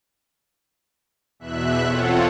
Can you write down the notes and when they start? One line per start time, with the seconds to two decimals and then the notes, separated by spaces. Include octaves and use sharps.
1.39 E2 B2 E5 F#6
1.85 C4 F4 A4 C#5 F#5